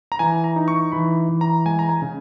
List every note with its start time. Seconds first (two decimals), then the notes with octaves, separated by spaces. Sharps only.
0.12 A#5
0.19 E3 G#5
0.44 A#5
0.56 D#4
0.68 C#6
0.92 E3 B5
1.29 E3
1.41 A#5
1.66 G#3 G#5
1.79 A#5
1.89 G#5
2.02 C#3